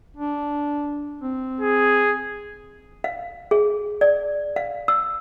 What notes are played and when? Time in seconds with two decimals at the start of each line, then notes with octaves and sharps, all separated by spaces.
0.17 D4
1.21 C4
1.60 G#4
3.04 F5
3.51 G#4
4.01 D5
4.56 F5
4.88 E6